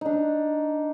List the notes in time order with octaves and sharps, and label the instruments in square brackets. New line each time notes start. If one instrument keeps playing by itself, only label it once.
[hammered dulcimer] D4 D#4